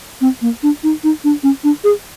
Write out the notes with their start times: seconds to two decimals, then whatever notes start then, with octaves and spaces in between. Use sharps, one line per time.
0.21 C4
0.42 A#3
0.63 D4
0.83 D#4
1.04 D#4
1.24 D4
1.43 C#4
1.64 D4
1.84 G#4